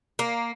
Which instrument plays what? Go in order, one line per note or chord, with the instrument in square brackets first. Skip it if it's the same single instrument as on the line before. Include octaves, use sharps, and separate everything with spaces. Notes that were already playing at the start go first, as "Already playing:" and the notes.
[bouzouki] A#3